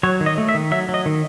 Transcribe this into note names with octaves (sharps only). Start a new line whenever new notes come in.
F#3 C#5
D#3
D#5
A3
E5
D#3
F#3 E5
F#3
D#5
D#3